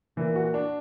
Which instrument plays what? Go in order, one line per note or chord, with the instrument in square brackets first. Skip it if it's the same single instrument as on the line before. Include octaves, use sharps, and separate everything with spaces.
[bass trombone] A#2 [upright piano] E3
[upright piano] F#4
D4